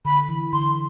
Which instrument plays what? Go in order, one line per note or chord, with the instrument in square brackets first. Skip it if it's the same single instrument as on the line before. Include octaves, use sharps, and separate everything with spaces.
[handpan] D3 [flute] B5
[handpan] E3
[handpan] D3 [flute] C6